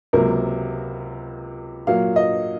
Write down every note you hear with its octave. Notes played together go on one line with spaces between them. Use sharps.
C#2 C3 F#3 A#3 A#4
A#2 F#3 A#3 F5
D#5